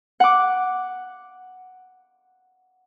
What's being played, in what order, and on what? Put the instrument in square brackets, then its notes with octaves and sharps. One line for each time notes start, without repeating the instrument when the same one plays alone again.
[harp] F#5 D6